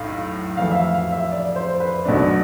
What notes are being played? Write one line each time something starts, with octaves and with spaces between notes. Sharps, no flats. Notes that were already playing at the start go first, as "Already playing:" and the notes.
Already playing: B1 A2 F5
F2 E3 A3 F5
E5
F5
F5
E5
D5
C5
B4
B1 B2 A3 D4